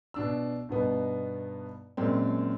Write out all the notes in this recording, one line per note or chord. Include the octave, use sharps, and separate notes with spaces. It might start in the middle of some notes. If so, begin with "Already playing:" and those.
B2 D4 E6
G2 B2 B3 D#4
F#2 A#2 G#3 C4